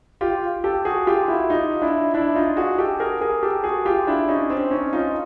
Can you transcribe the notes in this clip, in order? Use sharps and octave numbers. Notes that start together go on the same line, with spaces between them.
F4 G4
G4 A4
F#4 G#4
F4 G4
E4 F#4
D#4 F4
D4 E4
D4 E4
D#4 F4
F#4 G#4
G4 A4
G#4 A#4
G#4 A#4
G4 A4
F#4 G#4
F4 G4
D4 E4
C#4 D#4
C4 D4
C#4 D#4
D#4 F4